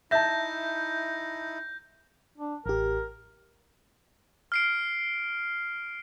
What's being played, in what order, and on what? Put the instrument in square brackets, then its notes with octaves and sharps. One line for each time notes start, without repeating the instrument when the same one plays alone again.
[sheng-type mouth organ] D#4 E4 [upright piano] E5 A5 [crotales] G6 A#6
[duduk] D4
[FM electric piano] A1 G4 [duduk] A#4
[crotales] F6 C7 D7